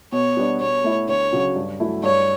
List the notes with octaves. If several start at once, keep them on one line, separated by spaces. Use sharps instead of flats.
B2 C#5
G3 B3 D4
B2 C#5
A3 E4
D2 C#5
C#3 F#3
G2
F#3 A3 E4
G2 C#5